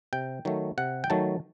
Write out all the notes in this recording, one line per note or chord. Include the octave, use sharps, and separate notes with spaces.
C3 G5
D#3 F#3 A3
C3 F#5
G5
D#3 F#3 A3 A5